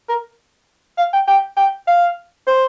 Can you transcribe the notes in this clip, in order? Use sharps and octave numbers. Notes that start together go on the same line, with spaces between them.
A#4
F5
G5
G5
G5
F5
C5